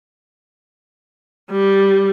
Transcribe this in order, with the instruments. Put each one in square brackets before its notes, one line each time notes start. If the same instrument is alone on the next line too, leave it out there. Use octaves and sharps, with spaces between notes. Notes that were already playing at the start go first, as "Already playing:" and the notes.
[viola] G3